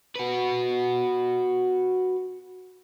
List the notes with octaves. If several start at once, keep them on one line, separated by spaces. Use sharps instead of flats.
F#4 B4